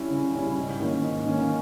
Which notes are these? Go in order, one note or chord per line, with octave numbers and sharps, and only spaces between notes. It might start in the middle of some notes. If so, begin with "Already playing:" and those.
Already playing: G3 C#4 E4
C#3
G3 C#4 E4
G#2
D#3 A#3 C#4
G#2
D#3 A#3 C#4